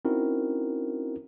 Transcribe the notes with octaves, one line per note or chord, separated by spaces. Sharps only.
C4 C#4 D#4 E4 F#4 A#4